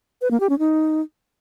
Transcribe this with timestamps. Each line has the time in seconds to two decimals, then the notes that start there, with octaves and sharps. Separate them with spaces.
0.21 B4
0.31 A#3
0.40 G4
0.50 C#4
0.59 D#4